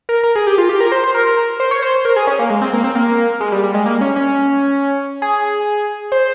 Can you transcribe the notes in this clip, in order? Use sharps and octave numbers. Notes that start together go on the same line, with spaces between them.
A#4
A#4
G#4
G4
F4
G4
A#4
C5
C5
A#4
C5
C#5
C5
C5
A#4
G#4
C#4
A#3
G#3
C4
A#3
C4
A#3
G#3
G3
G3
G#3
A#3
C#4
C#4
G#4
C5